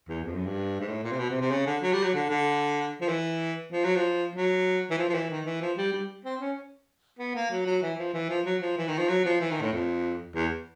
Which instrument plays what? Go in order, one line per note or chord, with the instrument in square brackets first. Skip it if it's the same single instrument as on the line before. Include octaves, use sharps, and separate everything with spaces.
[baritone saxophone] E2
F2
F#2
G2
G#2
A2
A#2
C3
B2
C3
C3
C#3
D3
F#3
G3
F#3
D3
D3
F3
E3
F3
F#3
F3
F#3
E3
F3
F3
E3
D#3
E3
F3
G3
G3
C4
C#4
B3
A#3
F#3
F#3
E3
F3
E3
F3
F#3
F3
E3
D#3
F3
F#3
F3
E3
D#3
A2
F2
E2